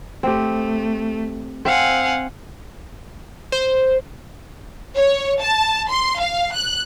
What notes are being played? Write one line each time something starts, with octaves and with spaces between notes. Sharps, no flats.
A3 C4 G4
C4 C5 F5 F#5 G#5
C5
C#5
A5
C6
F5
F#6